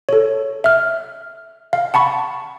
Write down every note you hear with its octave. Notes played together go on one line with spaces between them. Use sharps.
A4 C#5
E5 F6
F5
F#5 A5 B5 C#6